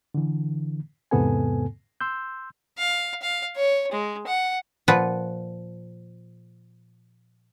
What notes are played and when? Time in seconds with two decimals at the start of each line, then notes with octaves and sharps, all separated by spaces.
0.14 D3 E3
1.11 E2 G#2 C3 B3 A4 G#5
2.01 C6 E6 G6
2.78 F5
3.22 F5
3.56 C#5
3.92 G#3
4.27 F#5
4.88 A#2 F3 B4 F#5